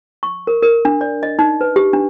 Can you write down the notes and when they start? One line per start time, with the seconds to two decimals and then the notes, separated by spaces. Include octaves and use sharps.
0.23 C#6
0.47 A#4
0.63 A#4
0.85 D4
1.01 D5
1.23 D#5
1.39 D#4
1.61 B4
1.76 G4
1.93 D4